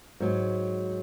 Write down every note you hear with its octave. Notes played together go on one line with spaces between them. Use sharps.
G#2 F#3